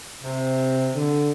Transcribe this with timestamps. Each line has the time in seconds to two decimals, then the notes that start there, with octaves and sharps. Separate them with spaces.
0.24 C3
0.95 D3